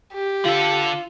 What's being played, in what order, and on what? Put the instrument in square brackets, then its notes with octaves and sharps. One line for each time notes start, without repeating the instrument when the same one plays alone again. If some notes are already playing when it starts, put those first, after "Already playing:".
[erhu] G4
[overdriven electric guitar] D3 A4 [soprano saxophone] F4